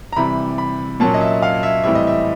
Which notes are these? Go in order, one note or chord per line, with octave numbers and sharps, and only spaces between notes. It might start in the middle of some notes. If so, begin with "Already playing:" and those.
A#5
C3 E3 G3 B5
B5
A#2 F#3 A#3 C#4 A5
D#5
E5
F5
E5
A2 E3 G3 C4 E5
D#5
E5